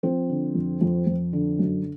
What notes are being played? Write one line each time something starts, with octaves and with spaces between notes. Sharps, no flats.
F3 C4
D3
F2
F2
F2
D3
F#2